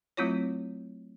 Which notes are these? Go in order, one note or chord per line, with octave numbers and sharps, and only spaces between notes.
F#3 A3 C4 E4 F4 C#5